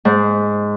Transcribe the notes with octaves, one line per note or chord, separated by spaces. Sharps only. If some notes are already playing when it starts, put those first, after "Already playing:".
G#2